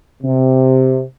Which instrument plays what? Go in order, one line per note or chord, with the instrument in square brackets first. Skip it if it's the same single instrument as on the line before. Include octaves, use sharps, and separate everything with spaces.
[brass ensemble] C3